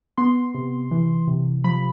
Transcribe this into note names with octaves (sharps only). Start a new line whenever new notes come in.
B3 C6
C3
E3
C3
F3 B5